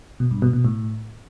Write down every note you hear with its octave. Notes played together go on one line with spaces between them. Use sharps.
B2
G2
B2
B2
A2